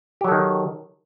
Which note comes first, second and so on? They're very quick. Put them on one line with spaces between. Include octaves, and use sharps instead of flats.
G4 F#3 A4 D#3